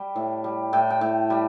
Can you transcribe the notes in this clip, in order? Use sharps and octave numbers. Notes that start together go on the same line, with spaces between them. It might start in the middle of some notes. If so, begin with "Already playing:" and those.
Already playing: G3 G5
A2
G3
A2 G5
G5
A2
G3